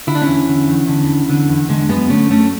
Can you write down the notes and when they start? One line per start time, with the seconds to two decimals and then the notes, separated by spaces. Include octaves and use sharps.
0.07 D3 E4
0.15 D4
0.22 C#4 E4
0.28 E2
0.48 D3
0.68 E2
0.88 D3
1.09 E2
1.29 D3
1.49 E2
1.69 D3 G#3
1.89 F#2 G#3 B3
2.10 D3 A3 C#4
2.30 F#2 A3 C#4